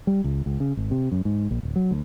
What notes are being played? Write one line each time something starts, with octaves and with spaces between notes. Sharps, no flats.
G3
C#2
C#2
C#3
G#1
C3
F#2
G#2
A#1
D1
F#3
D2